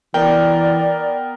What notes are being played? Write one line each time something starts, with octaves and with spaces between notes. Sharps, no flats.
E3 B3 A#4 D5 G5